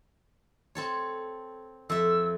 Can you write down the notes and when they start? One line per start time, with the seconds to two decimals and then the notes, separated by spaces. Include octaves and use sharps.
0.75 C4 A4 C#5
1.90 F2 E5 E6